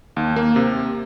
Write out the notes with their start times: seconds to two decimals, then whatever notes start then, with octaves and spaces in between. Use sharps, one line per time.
0.16 D#2
0.36 A#3
0.56 C3